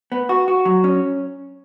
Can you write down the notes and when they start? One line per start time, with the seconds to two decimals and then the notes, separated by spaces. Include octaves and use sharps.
0.12 B3
0.29 F#4
0.48 F#4
0.65 F#3
0.84 C#4